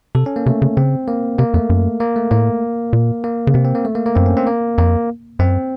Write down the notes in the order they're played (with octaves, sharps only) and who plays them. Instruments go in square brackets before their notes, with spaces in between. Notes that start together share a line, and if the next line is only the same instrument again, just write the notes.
[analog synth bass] C3 [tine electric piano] A4
[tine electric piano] C#4
A#3
[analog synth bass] C3 [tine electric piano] A3
[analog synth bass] C#3
[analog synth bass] C#3 [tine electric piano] C4
[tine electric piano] A#3
[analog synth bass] C3 [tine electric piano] A#3
[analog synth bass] F2 [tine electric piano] A3
[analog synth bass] F#2
[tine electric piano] A#3
A3
[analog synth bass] A2 [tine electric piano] A#3
[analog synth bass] A#2
[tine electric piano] A#3
[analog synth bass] C#3
[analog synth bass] C3 [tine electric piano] C4
[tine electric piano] C4
A#3
A3
A#3
A#3
[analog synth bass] F#2 [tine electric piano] C4
[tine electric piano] C#4
C4
A#3
[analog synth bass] F2 [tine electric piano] A#3
[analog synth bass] F#2 [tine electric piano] C4